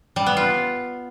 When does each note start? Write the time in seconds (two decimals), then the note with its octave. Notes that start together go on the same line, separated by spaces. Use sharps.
0.16 G3
0.26 B3
0.37 F4